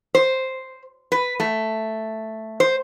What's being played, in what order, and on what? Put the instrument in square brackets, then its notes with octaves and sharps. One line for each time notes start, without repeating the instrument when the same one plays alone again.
[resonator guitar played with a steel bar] C5
B4
A3
C5